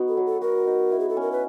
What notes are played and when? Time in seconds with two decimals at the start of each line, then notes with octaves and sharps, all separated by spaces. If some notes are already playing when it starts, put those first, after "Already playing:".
Already playing: B3 D#4 F#4
0.08 A4
0.17 F#3
0.26 A4
0.42 F#4 A#4
0.67 D#4
0.91 E4
1.00 G#4
1.09 A4
1.17 C#4 A#4
1.32 B4